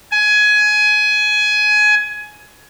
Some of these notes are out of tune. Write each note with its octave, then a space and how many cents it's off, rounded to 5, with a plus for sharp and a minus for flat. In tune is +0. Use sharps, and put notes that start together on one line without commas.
G#5 +20